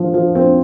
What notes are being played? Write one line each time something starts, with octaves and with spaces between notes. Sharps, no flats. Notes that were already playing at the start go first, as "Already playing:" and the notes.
Already playing: F3
F3
C4